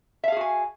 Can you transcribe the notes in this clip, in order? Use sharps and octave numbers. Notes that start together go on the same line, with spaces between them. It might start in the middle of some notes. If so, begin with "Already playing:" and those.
F#4 G#4 E5 F5 G#5